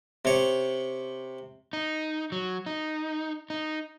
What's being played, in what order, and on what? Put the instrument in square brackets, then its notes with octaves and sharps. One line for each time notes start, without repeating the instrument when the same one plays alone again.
[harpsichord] C3 C#5
[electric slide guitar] D#4
F#3
D#4
D#4